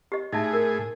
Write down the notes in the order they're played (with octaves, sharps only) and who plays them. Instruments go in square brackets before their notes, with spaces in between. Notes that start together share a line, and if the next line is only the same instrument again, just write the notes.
[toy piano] G4 D#5
[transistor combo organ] A2 G#4 [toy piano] D#4 E5 A5
[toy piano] A#4